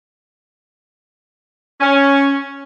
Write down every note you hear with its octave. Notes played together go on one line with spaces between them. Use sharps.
C#4